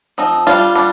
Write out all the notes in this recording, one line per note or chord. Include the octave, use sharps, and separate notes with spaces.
F3 C4 D#4
G3 D4 F4
G3 D4